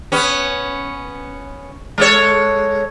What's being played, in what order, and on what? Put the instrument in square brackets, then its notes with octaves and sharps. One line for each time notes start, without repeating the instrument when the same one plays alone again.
[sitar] B3 C#4
G#3 A4 C#5